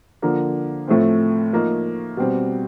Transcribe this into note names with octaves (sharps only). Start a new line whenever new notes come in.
D3 F3 A#3
A2 F3 A3 C4
F3 A#3 D#4
B2 G3 C4